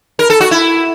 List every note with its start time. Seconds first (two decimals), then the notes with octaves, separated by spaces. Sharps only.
0.19 A#4
0.30 A4
0.40 F#4
0.51 E4